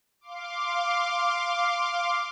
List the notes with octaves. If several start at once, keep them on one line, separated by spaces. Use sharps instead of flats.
F5 C6 D6